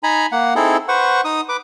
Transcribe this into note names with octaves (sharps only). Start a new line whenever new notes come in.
D#4 G#5 A#5 B5
A#3 F#5
C4 D#4 E4 G#4 A4
B4 C5 F#5 C#6
D#4 D#6
B4 D6